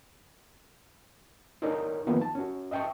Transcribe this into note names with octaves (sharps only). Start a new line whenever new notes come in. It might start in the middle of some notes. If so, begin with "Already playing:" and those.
D4 D#4 A#4 C#5
D#3 F3 A#3 B3
A5
C#4 F#4
D#5 E5 G5 A5 C#6